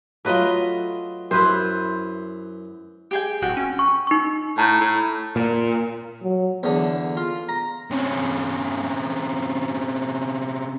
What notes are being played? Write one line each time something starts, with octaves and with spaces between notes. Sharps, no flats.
F#3 A3 F4 B4 D#5
F#2 E4 B4 C5
G4 G#4 G5
D1 F#4 G5
C#4
C#6
D#4 C#6
A2 A5 A#5 G6
A2
A#2
F#3
E2 D3
F4
A#5
C3 C#4